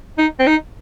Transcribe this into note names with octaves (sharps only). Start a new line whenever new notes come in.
D#4
C4
D#4